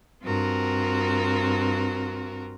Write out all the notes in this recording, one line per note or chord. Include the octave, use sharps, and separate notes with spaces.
G2 C4 F4 F#4 A#4